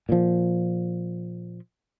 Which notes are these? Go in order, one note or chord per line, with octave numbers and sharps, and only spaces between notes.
A#2 F3